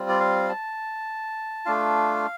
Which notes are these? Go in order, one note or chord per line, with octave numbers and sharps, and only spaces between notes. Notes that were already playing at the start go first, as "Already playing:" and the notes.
Already playing: G3 C4 F4
D5
F5
A5
A3 D4 F4 F5